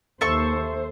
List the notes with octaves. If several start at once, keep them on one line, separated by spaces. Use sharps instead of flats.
D#2 A4 C5 E5 C#6